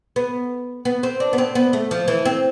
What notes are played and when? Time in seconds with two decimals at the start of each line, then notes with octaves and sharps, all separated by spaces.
0.16 B3
0.85 B3
1.03 C4
1.20 D4
1.33 B3
1.38 C4
1.55 B3
1.73 A3
1.91 F3
2.08 E3
2.25 C4